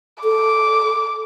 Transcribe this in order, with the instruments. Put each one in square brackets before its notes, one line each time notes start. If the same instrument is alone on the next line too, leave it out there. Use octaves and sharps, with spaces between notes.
[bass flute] A4 [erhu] D6